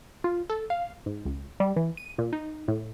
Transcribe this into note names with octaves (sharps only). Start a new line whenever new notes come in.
F4
A4
F5
G#2
C#2
G3
E3
D#7
A#2
D#4
A2